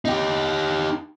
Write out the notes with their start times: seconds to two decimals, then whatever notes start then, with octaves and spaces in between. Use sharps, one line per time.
0.05 D#4 G4